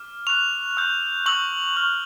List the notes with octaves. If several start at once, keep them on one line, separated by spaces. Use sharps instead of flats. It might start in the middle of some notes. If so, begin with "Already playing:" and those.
Already playing: D6 F6
C#6 F#6 F7
C#6 E6 G6
C#6 E6 G6 F#7
C#6 F6